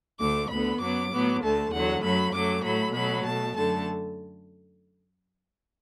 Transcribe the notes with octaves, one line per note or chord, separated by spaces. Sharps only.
D2 D3 A3 D6
D2 D3 B3 B5
F#2 F#3 B3 D6
A2 F#3 B3
D2 D3 A3 A5
E2 D3 F#3 F#5
F#2 F#3 A3 B5
F#2 F#3 A3 D6
A2 F#3 A3 B5
B2 F#3 A3 B5
B2 A3 A5
F#2 D3 A3 A5